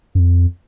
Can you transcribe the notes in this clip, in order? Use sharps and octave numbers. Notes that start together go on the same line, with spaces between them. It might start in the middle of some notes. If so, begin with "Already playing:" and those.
F#2
F2